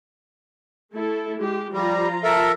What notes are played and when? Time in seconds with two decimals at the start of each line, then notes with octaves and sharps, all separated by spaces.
0.93 A3 E4 A4
1.39 G#3 G4
1.73 F3 G3 F4 A#5
2.24 A4 A#4 E5